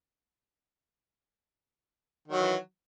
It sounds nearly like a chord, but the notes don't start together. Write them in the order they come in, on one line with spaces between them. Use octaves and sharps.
D#3 F#3 E3